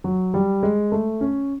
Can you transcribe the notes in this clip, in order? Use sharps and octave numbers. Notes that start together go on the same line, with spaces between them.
F#3
G3
G#3
A3
C#4